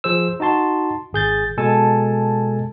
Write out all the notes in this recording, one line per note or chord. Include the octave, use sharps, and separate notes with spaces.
F3 G#4 C5 E6
D#4 F#4 A5 C6
G#1 G#4 G6 A6
B2 G#3 A4 G#5 A5